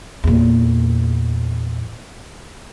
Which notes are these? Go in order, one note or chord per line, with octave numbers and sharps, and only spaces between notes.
E2 A#2